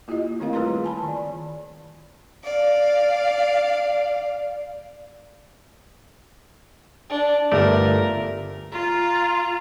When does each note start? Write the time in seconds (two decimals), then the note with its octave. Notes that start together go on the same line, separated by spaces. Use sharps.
0.08 A#3 E4 F4 G4 D#5
0.40 D#3 A3 C4 E4 A#4 F5
0.53 G3 F4 G#4 B4 A#5 C6
0.84 G#5 A5 B5
1.03 D#3 D5
2.44 D5 F5
7.10 D4
7.51 G1 A3 A#4 D5
8.72 F4 A#5